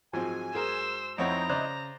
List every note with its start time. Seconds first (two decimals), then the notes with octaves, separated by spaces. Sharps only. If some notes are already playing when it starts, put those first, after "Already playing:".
0.13 G#2 F3 F#3 G#3 C4 G#5
0.55 G#4 A#4 C5 E6
1.18 F2 C4 D#4 E4 C#5 D#5 F#5 A#5
1.49 C#3 C5 D5 F#6